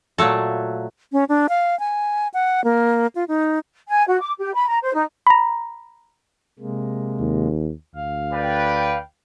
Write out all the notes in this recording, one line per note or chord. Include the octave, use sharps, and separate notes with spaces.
A#2 F#3 A3 A4
C#4
D4
F5
G#5
F#5
A#3
F4
D#4
G#5
F#4
D6
G4
B5
A#5
C5
D#4
A#5 B5
C3 G#3 A#3
D#2
D2 F5
B4 D5 G5